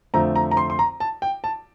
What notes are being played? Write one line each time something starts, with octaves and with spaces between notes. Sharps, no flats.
F2 D3 F3 A3 C4 A#5
A#5
A#5
C6
C6
A#5
A5
G5
A5